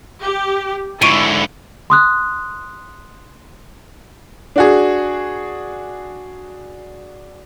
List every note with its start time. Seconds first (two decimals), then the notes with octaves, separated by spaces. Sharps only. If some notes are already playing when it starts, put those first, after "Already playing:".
0.21 G4
1.02 G#2 D3 E4 C#6 D7 D#7
1.90 C6 D#6 F#6
4.56 D4 F#4 G#4